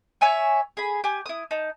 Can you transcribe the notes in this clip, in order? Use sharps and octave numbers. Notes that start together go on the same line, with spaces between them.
C#5 E5 G#5 C#6
G#4 B5
G4 G#5
E4 D#6
D#4 A5